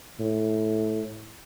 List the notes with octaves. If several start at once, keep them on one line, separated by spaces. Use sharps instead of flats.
A2